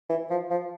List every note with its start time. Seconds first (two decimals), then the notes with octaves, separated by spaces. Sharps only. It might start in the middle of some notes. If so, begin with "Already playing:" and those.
0.10 E3
0.30 F3
0.50 F3